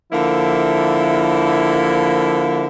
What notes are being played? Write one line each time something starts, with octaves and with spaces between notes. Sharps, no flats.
D3 F3 A#3 E4